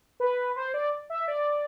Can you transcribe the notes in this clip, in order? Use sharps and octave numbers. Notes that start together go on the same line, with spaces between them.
B4
C5
D5
E5
D5